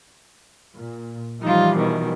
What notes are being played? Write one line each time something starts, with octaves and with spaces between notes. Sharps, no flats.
A#2
E3 F3 G3 D#4 F4
B2 D#3